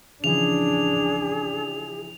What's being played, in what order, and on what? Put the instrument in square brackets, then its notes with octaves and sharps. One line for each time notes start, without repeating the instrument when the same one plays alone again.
[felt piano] C#3 E3 F3 [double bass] D4 [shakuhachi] G#4 [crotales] F7